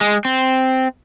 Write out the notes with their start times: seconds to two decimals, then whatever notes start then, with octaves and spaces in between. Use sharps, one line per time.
0.01 G#3
0.25 C4